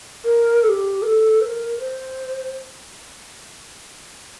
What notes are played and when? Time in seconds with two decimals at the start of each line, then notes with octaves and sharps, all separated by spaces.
0.25 A#4
0.64 A4
0.68 G4
1.02 A#4
1.07 A4
1.41 C5
1.46 A#4
1.80 C5